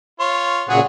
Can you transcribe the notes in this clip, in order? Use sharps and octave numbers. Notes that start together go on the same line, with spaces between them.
F4 C#5 C6
A#2 C#3 F#3 G#4 F#5